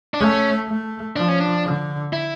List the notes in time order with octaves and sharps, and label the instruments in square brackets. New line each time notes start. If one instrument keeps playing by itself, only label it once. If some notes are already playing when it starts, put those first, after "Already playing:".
[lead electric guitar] D4
[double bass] A3 [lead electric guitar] C#4
[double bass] A3
[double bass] F3 [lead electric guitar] D4
[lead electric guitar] C#4
D4
[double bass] D3
[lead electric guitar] E4